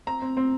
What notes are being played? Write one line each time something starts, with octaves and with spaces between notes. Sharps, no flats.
C4 A#5
C4
C4